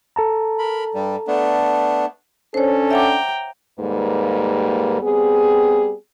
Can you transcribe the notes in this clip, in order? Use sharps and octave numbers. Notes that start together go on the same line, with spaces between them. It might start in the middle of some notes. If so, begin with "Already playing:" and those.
A4 A5 A#5
A#4 B5
G2 G3
A3 B3 D4
C#4 D4 A4 C5 C#5
E5 F#5 G5 A#5 D6
D#2 G#2 G3 A#3 A4 B4
G3 B3 C4 G#4